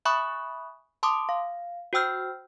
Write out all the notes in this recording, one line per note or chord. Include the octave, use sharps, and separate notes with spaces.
E5 G#5 B5 C#6 D#6 F#6
A5 C6 D6 D#6
F5
F#4 C5 G5 E6 F6 G6